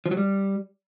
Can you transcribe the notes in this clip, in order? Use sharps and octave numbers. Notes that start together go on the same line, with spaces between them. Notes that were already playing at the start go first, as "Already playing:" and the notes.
F3
F#3
G3